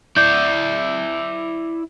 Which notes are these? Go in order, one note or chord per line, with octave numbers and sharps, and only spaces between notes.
E4 D5 G6